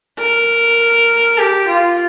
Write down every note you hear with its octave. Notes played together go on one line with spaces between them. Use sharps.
A#4
G4
F4